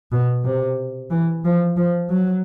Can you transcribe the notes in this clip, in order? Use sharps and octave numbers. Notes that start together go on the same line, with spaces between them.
B2
C3
E3
F3
F3
F#3